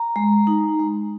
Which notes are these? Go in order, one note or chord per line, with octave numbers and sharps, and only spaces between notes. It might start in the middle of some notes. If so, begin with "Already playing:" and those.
Already playing: A#5
G#3
D#4
G#3